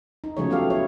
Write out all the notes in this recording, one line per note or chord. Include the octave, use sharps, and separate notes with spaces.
D#4
C#3 F3 F#3 A3 G#4 C#5
F#3 B3 G4 A4 F5
E4 C#5